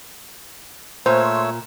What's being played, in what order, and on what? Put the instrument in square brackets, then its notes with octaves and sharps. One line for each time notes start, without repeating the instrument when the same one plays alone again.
[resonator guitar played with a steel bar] A#2 [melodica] A3 C#5 E6 [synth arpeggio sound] C5